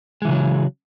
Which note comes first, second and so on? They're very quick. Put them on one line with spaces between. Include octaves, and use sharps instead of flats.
G#3 E3 C#3 F#3